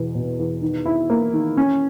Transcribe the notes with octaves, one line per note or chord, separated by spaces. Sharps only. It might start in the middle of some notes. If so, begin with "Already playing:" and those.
Already playing: E2 B2
B2
E2
D#3
E4
A#3
D#3
C#4